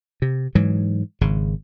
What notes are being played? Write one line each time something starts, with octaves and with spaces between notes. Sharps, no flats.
C3
G#2 E3 F#3
G#1 C#3